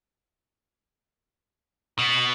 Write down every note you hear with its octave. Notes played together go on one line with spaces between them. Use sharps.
B2